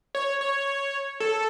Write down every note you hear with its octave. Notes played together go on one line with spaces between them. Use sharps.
C#5
C#5
A4